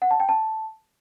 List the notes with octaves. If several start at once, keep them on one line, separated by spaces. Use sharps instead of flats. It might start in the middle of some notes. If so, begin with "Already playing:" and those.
F#5
A5
G5
A5